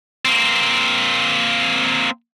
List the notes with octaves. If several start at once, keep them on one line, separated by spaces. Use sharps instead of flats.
A#3 C4